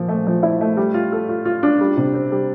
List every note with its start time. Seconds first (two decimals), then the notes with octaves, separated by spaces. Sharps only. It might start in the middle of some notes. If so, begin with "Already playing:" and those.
Already playing: A#2 F3
0.08 A3
0.27 F3
0.43 E4
0.61 A3
0.77 G3
0.94 F4
1.12 A4
1.29 F4
1.45 F4
1.63 D4
1.81 G3
1.97 C3
2.14 C4
2.32 G3